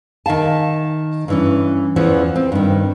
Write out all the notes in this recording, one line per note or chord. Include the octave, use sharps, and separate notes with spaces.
D#3 E5 F5 A5
G2 E3 C#4
E2 E3 F3 B3 C#4
C4
G2 D#3